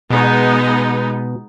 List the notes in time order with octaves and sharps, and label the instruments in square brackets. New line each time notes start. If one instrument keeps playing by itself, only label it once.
[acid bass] B2 [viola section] G#3 B3 D#4